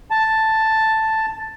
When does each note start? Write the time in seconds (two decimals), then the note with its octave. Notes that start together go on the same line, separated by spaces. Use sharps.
0.10 A5